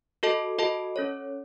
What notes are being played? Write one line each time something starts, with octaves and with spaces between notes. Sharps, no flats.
F#4 A4 D#5 A5
F#4 A4 D#5 A5
C#4 A4 C#5